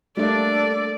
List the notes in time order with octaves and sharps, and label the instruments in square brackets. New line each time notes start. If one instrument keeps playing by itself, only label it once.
[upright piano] G3 A3 A#3 [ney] D4 [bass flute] A4 [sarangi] D5